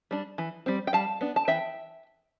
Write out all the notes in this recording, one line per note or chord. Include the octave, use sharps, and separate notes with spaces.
G3 D4
E3
G3 C4
G5
G3 F5 A5
B3 D4
A5
E3 E5 G5